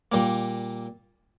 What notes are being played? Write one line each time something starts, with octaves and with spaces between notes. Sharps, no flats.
A#2 G3 A#3